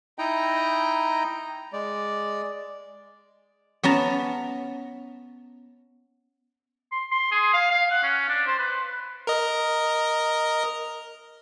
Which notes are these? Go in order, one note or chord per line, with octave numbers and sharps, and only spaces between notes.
D#4 E4 D#5 G5 A#5
G#3 D5
B3 C#4 A5 A#5
C6
C6
G#4
F5
F5
F#5
C#4
D4
C5
B4
A#4 D#5